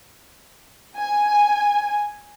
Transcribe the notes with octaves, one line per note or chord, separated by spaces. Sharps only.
G#5